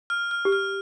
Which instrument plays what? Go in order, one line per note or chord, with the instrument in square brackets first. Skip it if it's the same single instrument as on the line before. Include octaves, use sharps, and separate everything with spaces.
[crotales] F6
F6
[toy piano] G4
[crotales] F6